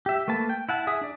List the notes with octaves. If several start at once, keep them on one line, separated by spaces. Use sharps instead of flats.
G4 E5
A3 A#3 B4 A5
G5
E4 F#5 A5
G#4 E5 D#6
D4 D5